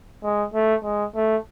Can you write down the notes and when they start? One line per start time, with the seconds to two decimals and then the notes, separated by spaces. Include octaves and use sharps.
0.23 G#3
0.54 A3
0.84 G#3
1.15 A3